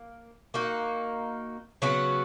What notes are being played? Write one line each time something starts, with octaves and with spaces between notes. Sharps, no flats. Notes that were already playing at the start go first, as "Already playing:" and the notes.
Already playing: A#3
A#3 D#4 F#4
C#3 F#3 B3 F#4